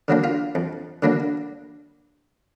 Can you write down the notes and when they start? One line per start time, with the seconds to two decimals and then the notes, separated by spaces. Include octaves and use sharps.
0.08 D3 F#3 A#3 D4
0.24 F4
0.55 F2
1.03 D3 F#3 A#3 D4